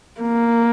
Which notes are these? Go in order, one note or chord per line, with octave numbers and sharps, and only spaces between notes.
A#3